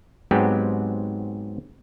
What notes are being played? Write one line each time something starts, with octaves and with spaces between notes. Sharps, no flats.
G#2 F#3 G#3 B3 C4 G4